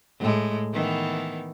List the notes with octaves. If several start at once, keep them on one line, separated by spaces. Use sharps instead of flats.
A2 G#3
D#3 E3 B3